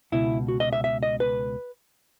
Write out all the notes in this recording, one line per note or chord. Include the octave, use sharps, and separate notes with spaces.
C#2 B2 E4
F#4
D#5
E5
E5
D#5
B4